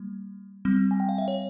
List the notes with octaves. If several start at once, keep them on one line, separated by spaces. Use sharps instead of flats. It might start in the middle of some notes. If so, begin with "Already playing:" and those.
Already playing: G3 A#3
G3 C4
G#5
G5
F5
E5
C#5